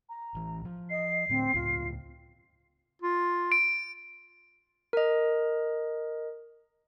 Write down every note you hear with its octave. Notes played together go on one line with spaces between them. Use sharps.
A#5
A1 E3
F3
D#5 C7
A2 D3 C4
C#2 A2 F4
F4
D7
A#4 D#5